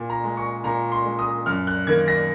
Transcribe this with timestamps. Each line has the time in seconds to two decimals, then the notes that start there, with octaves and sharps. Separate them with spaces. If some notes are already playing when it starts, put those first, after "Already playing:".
Already playing: A#2
0.10 A#5
0.24 G#3
0.37 C#6
0.64 A#2 A#5
0.92 C6
1.05 G#3
1.19 D#6
1.46 F#2 F6
1.67 F#6
1.87 D#3 A#3 G#6
2.08 A#6